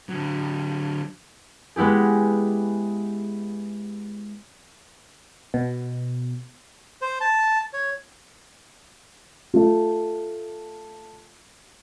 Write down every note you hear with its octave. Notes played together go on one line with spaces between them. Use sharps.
D3 F#3
G#3 B3 E4 G4 G#4
B2
C5
A5
C#5
A3 F4